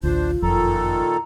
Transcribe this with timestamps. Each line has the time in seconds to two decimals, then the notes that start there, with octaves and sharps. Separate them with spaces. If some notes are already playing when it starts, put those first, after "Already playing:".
0.03 A1 D2 D4 F4 C5
0.42 F#1 F2 A#2 D#3 A4 A#5